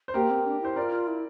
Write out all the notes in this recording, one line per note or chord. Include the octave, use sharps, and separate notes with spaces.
C5
A#3 G4 A#4
C4
D4
E4 C5
F4 A#4 D5
E4